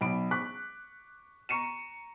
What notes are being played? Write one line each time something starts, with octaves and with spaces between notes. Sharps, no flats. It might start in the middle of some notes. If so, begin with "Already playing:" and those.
B1 B5 D7
C#6 D6 F#6 B6
A#5 C#6 C#7 D#7 E7